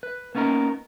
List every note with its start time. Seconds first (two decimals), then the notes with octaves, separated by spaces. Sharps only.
0.03 B4
0.35 A#3 B3 C#4 D#4 A#4